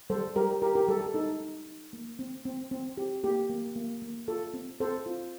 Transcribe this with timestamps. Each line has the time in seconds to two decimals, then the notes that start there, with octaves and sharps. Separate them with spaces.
0.10 G3 A4 C5
0.36 G3 G4 A#4
0.62 G4 A#4
0.75 G4 A#4
0.88 G3 A4
1.01 A4
1.14 D#4 A4
1.40 D#4
1.66 D#4
1.93 A#3
2.19 C4
2.45 C4
2.71 C4
2.97 G4
3.23 A#3 G4
3.50 A#3
3.76 A#3
4.02 A#3
4.28 F4 A4
4.54 C4
4.80 C4 A4 C5
5.06 F4